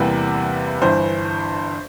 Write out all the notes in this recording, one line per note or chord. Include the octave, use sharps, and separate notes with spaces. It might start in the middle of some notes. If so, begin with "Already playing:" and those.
Already playing: E2 C3 E3 G3 A#3 B4
G1 G2 E3 C5